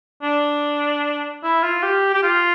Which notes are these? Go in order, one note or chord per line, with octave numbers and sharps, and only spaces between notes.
D4
E4
F4
G4
G4
F4